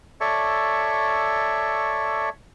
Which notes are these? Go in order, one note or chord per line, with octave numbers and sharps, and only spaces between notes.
A4 C#5 D5 E5 C#6